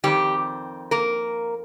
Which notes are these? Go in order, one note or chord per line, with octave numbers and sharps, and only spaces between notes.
F2 D#3 G3 C4 G4
A#3 A#4